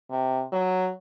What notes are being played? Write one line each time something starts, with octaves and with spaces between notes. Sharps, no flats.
C3
F#3